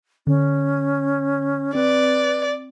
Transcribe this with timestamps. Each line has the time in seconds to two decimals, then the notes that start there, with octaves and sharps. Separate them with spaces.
0.27 D3 C#4
1.75 C4 B4 D5